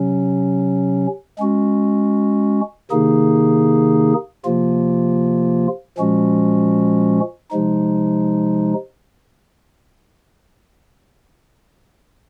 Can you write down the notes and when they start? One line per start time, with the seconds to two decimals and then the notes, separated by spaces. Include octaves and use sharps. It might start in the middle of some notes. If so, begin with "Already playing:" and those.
Already playing: C3 F#3 C#4
1.39 G#3 C#4 F#4
2.91 C3 D#3 A#3 D#4 G#4
4.45 C3 F3 A#3 F4
5.98 A#2 F3 G#3 C#4 F#4
7.51 C3 F3 G#3 D#4